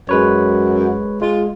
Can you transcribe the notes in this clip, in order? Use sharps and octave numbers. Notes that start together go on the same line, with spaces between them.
F#2 G#3 B4 C#5
G#3 F4